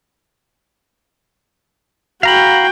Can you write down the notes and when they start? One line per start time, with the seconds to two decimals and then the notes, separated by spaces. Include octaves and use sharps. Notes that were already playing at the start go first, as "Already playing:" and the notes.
2.23 F#4 F5 G5 A#5 B5